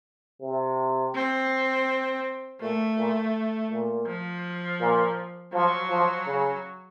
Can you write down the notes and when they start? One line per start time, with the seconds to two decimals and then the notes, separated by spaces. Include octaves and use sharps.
0.41 C3
1.15 C4
2.61 A#2 A3
2.98 A#2
3.71 A#2
4.07 F3
4.80 A#2
5.53 F3 F#3
5.91 F3
6.27 C#3